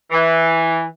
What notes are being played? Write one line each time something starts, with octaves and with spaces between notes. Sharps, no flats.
E3